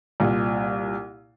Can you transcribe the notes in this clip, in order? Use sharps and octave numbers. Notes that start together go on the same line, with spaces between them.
C2 A#2